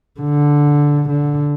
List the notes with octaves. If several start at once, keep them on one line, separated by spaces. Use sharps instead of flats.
D3
D3